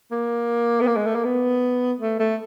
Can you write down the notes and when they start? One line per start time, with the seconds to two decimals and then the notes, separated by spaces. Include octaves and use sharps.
0.12 A#3
0.81 B3
0.87 A#3
0.96 G#3
1.06 A3
1.15 A#3
1.24 B3
2.00 A3
2.20 A3